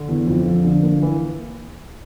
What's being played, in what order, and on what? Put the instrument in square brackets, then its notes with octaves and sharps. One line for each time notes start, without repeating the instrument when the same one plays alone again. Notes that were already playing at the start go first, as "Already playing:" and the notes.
Already playing: [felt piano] D3
[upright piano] E2
F2
F3
D3
A#3
[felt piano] E3